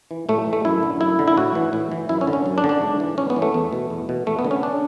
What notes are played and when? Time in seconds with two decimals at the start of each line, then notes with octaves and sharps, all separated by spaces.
0.11 E3
0.29 A2 A3
0.47 E3
0.53 A3
0.65 F#2 E4
0.83 D3
1.01 F#2 E4
1.19 D3
1.28 E4
1.37 A2 F#4
1.55 E3
1.73 A2
1.92 E3
2.09 F#2 E4
2.21 C#4
2.27 D3
2.33 C#4
2.46 F#2
2.58 D4
2.64 D3
2.69 D4
2.82 G#2
3.00 E3
3.18 G#2 C#4
3.30 B3
3.36 E3
3.42 A3
3.54 E2
3.73 B2
3.90 E2
4.09 B2
4.26 E2 A3
4.39 B3
4.45 D3
4.51 C#4
4.63 D4